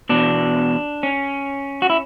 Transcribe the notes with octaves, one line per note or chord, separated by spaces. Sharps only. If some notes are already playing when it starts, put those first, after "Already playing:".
E2 B2 D4
C#4
F#4
E4